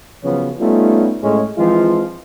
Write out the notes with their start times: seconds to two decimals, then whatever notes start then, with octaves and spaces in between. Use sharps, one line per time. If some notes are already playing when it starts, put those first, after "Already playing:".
0.23 C#3 F3 F#3 B3 C#4
0.59 G3 A3 B3 C#4 D#4 F4
1.22 A2 G#3 C#4
1.57 E3 F3 G#3 C4 F4